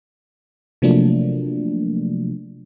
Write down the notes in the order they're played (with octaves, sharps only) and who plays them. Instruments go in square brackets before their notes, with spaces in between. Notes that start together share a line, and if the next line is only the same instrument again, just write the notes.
[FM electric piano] C3 F3 F#3 A3 A#3 D4